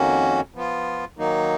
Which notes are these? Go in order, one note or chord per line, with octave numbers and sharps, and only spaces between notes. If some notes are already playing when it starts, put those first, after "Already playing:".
Already playing: F2 D#3 A#3 C#4 F#4
F3 B3 F4
D#3 F#3 A#3 D#4